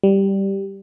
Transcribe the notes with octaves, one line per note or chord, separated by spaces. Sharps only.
G3